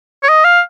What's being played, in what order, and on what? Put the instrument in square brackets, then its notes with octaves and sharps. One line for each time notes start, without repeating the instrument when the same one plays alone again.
[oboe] C#5
D#5
F5